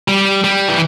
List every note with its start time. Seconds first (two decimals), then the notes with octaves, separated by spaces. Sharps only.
0.08 G3
0.44 G3
0.69 E3